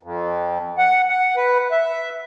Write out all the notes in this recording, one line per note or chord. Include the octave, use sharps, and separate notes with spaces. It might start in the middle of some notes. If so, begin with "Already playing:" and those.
F2
F#5
F#5
B4
E5